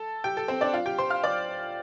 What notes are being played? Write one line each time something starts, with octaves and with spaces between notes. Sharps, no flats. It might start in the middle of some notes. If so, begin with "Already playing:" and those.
Already playing: A4 A5
G4 G5
A4
C4 C5
D4 D5
F4 F5
G4 G5
C5 C6
F5 F6
D5 D6